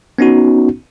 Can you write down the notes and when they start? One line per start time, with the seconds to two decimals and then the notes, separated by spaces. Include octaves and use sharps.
0.19 B3 C#4 D#4 F#4